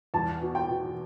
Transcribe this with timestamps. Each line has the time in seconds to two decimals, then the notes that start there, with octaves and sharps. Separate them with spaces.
0.14 E2 A5
0.42 B2
0.55 G5
0.69 B2